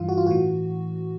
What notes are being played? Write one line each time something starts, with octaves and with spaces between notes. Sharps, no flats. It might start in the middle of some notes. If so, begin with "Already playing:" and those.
Already playing: G2 E3 F4
F#4
F4
A2 E3 F#4